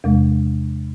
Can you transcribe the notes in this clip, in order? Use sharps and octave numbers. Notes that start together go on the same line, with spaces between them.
E2 C3 G#3